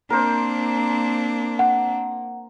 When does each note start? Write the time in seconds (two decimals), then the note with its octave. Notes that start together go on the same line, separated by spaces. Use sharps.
0.10 A#3 C4 D4 A#4 C5
1.59 F#5